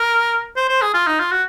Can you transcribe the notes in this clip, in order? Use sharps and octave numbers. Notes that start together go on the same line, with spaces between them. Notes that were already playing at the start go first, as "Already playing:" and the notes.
Already playing: A#4
C5
C5
G#4
F4
D#4
F4
F#4